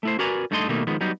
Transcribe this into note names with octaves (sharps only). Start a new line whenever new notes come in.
A3 E4 C5
F#4 A#4 B4 D5 G#5 A#5
G2 A3 D#4 A4 D#5 C6
B2 D#3 G3 A3 A#3 D#4
D#3 F3 G#3 B3
F#3 G3 B3 D#4